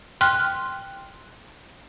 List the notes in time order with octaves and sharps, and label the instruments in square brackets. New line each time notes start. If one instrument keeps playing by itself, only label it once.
[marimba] G5 C6 F6 F#6